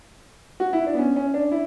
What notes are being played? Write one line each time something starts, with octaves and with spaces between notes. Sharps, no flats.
F#4
E4
D4
B3
C#4
C#4
D4
E4